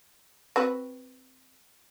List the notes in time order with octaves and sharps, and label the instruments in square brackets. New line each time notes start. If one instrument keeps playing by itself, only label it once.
[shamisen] C4 F#4 B4